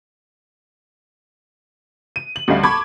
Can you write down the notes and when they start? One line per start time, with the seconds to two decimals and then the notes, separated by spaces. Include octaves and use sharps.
2.16 D#7
2.36 F#7
2.48 D2 G3 C#4 D#5 F5
2.63 A5 B5 C#6 D6 G#6